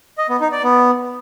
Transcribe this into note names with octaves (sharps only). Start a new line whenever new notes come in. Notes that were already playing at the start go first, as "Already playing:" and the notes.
D#5
B3
D#4
D5
B3